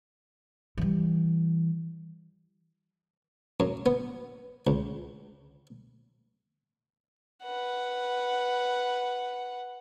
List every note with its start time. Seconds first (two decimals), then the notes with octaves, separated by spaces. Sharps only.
0.78 E3 G3
3.60 F#2
3.86 B3
4.67 C#2
7.43 B4 F#5